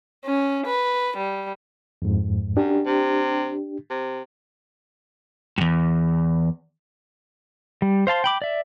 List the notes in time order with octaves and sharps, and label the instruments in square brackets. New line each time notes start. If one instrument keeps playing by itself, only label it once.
[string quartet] C#4
B4
G3
[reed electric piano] F2 G#2
[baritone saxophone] F#2 [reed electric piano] D4 G4
[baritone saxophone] C3
C3
[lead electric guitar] E2 G2
[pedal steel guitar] G3
C5 F5 A5 C6
G5 B5 D6
D5 E5